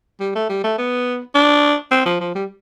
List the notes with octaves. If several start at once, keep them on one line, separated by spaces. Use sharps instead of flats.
G3
A3
G3
A3
B3
D4
C4
F3
F3
G3